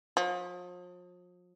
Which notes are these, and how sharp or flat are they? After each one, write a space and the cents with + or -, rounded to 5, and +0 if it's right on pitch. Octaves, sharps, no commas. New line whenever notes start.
F3 +40